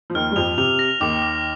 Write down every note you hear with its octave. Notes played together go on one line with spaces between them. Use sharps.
F3
D#2 D#3 F6
G3
F2 F3 F7
C3 F7
A#6
D#2 D#3 D6
D6